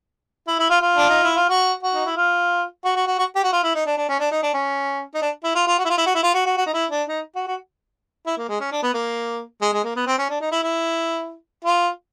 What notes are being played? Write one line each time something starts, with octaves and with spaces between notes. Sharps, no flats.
E4
E4
F4
F4
D4
D#4
E4
F4
F#4
F#4
D#4
E4
F4
F#4
F#4
F#4
F#4
G4
F#4
F4
E4
D#4
D4
D4
C#4
D4
D#4
D4
C#4
D#4
D4
E4
F4
F4
F#4
E4
F4
E4
F#4
E4
F4
F#4
F#4
F#4
D#4
E4
D4
D#4
F#4
F#4
E4
A#3
G#3
C#4
D4
B3
A#3
G#3
G#3
A#3
B3
C4
C#4
D4
D#4
E4
E4
F4